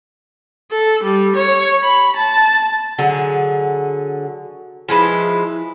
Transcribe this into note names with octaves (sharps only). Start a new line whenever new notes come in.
A4
G3
C#5
B5
A5
D3 F#3 G#4
F3 G#3 E4 B4